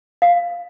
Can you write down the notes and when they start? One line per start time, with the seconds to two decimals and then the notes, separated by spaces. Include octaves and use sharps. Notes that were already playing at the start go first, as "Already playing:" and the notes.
0.22 F5